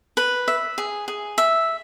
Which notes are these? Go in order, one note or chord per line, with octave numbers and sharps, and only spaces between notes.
B4
E5
G#4
G#4
E5